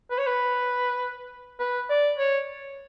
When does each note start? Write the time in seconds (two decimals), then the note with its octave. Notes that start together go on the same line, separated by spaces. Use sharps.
0.11 B4
0.18 C#5
0.27 B4
1.59 B4
1.90 D5
2.19 C#5